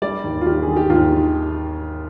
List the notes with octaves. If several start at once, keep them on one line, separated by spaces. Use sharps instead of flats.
G3 D5
D#2
F4
D#2 G4
G#4
D#3
G4
D#2 F4
D#3